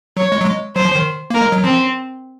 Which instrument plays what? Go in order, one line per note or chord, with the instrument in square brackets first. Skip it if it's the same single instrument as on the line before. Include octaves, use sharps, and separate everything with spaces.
[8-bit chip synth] F#3 [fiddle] C#5
[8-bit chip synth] G#3
F#3
G#3
[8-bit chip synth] F#3 [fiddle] C5
[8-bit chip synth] F3
D#3
[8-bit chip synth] A#3 [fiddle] A#4
[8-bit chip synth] G#3
F#3
[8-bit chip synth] F3 [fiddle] C4